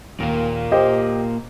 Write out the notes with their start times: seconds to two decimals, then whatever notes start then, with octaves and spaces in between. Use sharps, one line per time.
0.20 D#2 A#2 A#3
0.72 G4 C5 D#5